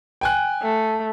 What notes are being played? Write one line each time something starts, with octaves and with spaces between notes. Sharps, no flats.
G5 G#5 F#6
A3